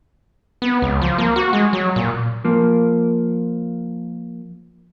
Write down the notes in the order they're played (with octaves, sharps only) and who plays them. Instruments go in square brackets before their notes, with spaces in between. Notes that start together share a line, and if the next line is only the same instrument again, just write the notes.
[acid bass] B3
C#2
F3
A#3
F#4
G#3
F#3
A#2
[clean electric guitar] F3 A#3